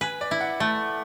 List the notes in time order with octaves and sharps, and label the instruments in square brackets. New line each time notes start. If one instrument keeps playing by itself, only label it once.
[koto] B4 [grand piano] G#5
[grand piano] D5
[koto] E4
[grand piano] F#5
[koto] A3